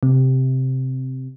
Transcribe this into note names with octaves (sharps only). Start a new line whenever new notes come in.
C3